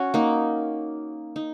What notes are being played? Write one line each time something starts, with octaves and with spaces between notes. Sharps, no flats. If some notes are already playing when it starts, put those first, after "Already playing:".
Already playing: C#4 F#4
A#3 D#4
D#4